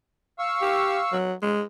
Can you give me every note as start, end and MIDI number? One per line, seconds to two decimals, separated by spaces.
0.39 1.18 77
0.39 1.18 85
0.39 1.18 88
0.62 1.00 67
1.12 1.33 54
1.43 1.63 56